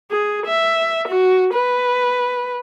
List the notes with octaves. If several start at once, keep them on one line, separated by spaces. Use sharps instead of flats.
G#4
E5
F#4
B4